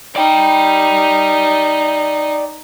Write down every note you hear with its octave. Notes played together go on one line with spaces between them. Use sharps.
D#4 D5 G5